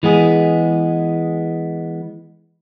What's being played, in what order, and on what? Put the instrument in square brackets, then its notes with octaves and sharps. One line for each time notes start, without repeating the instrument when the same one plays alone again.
[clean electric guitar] E3 G#3 B3 G#4